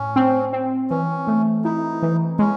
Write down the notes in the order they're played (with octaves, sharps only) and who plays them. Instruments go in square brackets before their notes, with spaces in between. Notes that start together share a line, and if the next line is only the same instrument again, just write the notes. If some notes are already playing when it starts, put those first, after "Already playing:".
Already playing: [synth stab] A2 [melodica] C#4
[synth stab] C4
C4
[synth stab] E3 [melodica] C#4
[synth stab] A3
[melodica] D#4 [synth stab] E4
[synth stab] E3
[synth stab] G#3 [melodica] C#4